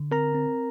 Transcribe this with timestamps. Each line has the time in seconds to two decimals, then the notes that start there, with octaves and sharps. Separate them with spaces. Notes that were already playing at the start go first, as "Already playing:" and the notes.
Already playing: D3
0.11 C4 A#4 A#5
0.35 C4